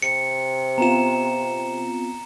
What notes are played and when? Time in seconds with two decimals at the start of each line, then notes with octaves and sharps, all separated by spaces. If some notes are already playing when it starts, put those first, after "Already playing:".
0.02 C3 C#7
0.78 B3 C4 F4 A#5 E7